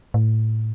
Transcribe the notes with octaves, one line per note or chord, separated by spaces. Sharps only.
A2